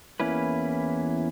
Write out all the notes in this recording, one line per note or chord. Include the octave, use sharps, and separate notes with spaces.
E2 A#3 C#4 E4 B4